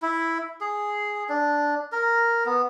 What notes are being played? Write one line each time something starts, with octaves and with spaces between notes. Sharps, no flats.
E4
G#4
D4
A#4
B3